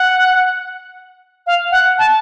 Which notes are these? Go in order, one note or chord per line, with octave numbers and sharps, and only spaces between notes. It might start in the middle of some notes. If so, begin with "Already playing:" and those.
Already playing: F#5
F5
F#5
A5